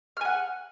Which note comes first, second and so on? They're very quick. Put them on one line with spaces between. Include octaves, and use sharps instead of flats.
F6 G#5 F#5